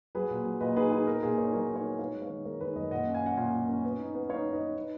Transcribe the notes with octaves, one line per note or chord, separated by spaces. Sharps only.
F#3 G#4 B4
A#2
F#3
A#2 B4 D#5
D#4 G#4 B4
D#4 G#4 B4
B3 A#4
A#2 G#4
D#4 A#4 C#5
F#3 A#4 C#5
D#4
A#4 C#5
B3
D#4 C#5 F5
G#3
C#5 F5
D#3
G#3 A#4 C#5
D#3 G#4 B4
F#2 B4 D#5
A#2 D#5 F#5
C#4
F5 G#5
C#4 F#5
A#2 F5 G#5
A#2
C#4
B3
D#4
B3
D#4 C#5 F5
D#4
B4 D#5
D#4
D#4